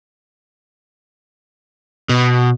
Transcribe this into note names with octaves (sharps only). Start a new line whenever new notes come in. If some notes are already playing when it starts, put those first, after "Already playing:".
B2